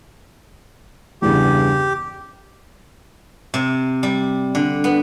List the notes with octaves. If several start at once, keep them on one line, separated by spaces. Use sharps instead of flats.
E2 G2 C#3 G4
C3
G3
D3
B3